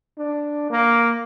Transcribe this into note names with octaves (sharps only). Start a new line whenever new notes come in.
D4
A#3